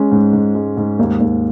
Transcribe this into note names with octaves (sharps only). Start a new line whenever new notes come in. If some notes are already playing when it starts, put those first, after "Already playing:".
Already playing: G#3 C#4
G#2
G#2
G#3
G#2
D#2
D#2